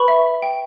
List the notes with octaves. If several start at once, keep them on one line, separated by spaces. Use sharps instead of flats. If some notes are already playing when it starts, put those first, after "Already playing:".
Already playing: B4 B5 C#6
E5
G5